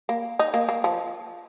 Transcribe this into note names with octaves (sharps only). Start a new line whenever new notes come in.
A#3
D#4
A#3
A#3
F3